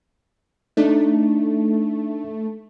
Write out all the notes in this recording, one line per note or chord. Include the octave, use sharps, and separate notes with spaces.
A3 D4 D#4